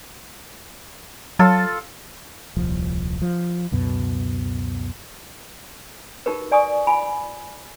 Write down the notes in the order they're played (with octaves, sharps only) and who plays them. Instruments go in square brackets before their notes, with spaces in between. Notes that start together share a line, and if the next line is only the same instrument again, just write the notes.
[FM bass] F#3 [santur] F4 A4 E6
[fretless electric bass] D#1 C2 F3
F3
C#2 F#2 B2
[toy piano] D#4 F#4 G4 A#4 B4
D5 G#5 C#6 D#6
F4 G#5 B5